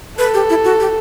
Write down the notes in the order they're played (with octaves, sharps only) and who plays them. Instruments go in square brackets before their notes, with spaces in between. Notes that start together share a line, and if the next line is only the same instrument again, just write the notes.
[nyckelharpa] A4 [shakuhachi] B4
[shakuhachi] G4
E4
F#4
G4